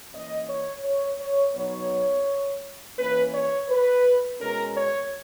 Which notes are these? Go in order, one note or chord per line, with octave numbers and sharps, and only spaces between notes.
E3 A#3 C#4 D#5
C#5
C#5
C#5
B2 F#3 B3 D#4 C#5
E3 A#3 C#4 B4
C#5
B4
B2 G#3 C#4 A#4
C#5